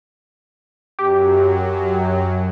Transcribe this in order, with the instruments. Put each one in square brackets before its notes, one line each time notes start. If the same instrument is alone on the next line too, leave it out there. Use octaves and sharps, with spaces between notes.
[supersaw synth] F#2 F#3 [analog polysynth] G4